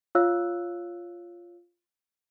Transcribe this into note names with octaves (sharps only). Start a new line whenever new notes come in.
F4 C#5 F5 E6 F#6